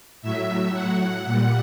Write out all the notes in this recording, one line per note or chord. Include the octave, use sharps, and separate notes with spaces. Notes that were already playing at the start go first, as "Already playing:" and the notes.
A2 F#3 E5
F#5
A#2 G3